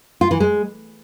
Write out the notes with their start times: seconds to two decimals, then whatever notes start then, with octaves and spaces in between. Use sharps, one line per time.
0.21 F4
0.31 E3
0.40 G#3